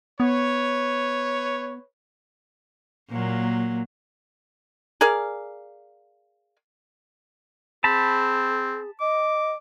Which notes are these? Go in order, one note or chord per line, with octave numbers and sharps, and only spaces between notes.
B3 B4 C#5
A#2 F#3 A#3
G#4 A#4 D5 F5
C4 G#4 A5 B5
D#5 D6